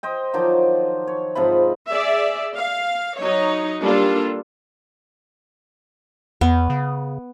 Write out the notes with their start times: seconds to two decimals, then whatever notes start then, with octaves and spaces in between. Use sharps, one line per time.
0.03 C5 D#5 G5
0.34 D#3 F3 F#3 D6
1.07 C#5
1.35 G#2 C3 F3 B5
1.88 G#4 D5 E5
2.54 F5
3.18 F#3 D#4 C#5
3.80 G3 A#3 D4 F4 A4
6.41 E2 B3
6.70 C#3